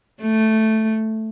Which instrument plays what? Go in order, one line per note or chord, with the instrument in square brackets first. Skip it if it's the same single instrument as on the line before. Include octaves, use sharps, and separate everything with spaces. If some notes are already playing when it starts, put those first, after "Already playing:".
[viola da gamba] A3